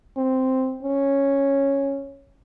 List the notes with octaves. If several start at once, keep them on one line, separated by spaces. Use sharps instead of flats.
C4
C#4